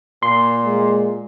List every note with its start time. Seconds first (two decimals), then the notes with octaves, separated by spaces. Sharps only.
0.23 A#2 C6
0.65 G#3